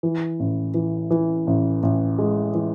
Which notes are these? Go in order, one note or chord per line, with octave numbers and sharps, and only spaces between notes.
E3
A1
E3
E3
A1
A1
G#3
E3